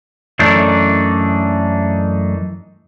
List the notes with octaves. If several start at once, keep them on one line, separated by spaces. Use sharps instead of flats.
F#2 E3 A3 D4 D#4